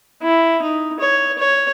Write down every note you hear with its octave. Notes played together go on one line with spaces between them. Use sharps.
E4
D#4
C#5
C#5